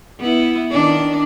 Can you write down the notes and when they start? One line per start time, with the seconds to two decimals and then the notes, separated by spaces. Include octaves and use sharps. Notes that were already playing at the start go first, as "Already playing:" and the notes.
0.20 B3 E4
0.72 D#3 D4